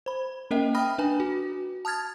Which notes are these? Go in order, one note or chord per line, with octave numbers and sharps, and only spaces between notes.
C5 B5
A#3 C#4 A#4 D#5 E5 G5
G5 B5 D#6 F6 A#6
D4 B4 G#5
F#4
A5 D#6 F6 G#6 A6